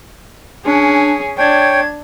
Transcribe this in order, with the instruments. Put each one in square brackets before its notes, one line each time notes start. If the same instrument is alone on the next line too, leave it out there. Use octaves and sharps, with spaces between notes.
[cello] C#4 G#4 [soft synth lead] D4
[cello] D4 [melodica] C#5 G5 [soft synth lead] G#6